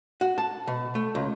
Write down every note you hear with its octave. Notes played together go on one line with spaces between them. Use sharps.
F#4
A5
B2
A3
C#2